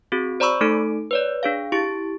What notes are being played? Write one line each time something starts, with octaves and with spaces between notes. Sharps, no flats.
C4 F#4 G#4
C5 D5 A#5 B5 C#6 E6
A3 D#4 A4 D7
B4 C#5 D5
D4 G#4 F5
E4 G4 C#6 A6 D7